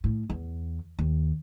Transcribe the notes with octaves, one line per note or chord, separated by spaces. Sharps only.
A2
E2
D#2